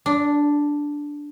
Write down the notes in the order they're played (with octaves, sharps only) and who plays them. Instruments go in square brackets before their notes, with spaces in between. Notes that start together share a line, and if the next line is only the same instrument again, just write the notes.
[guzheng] D4